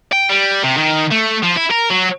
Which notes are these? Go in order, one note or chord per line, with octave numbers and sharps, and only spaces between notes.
G5
G3
C3
D#3
A3
F3
E4
A#4
F#3